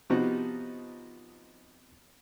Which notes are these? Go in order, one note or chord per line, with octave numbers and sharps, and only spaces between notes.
C3 F3 B3 D#4 F#4